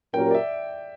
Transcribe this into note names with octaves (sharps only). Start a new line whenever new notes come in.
A#2 F#3 C#4 G4 A#4 G5
D5
E5